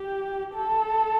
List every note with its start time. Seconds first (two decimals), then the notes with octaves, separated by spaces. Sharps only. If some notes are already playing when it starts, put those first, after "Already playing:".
Already playing: G4
0.55 A4